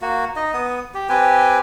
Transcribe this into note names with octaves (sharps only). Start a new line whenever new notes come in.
A#3 F#4
D#4 D#5
B3 D#6
G4
C4 G4 B4 G#5